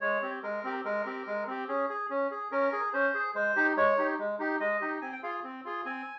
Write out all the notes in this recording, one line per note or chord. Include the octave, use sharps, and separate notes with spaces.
G#3 C#5
C4 G4
G#3 A#4
C4 G4
G#3 A#4
C4 G4
G#3
C4 G4
C#4 G#4
G#4
C#4
G#4
C#4 A#4
G#4
C#4 C5
G#4
G#3 C5
D#4 G4
G#3 C#5
D#4 G4
G#3
D#4 G4
G#3 D#5
D#4 G4
C4 G#5
G5
F4 G#4 F5
C4
F4 G#4
C4 G#5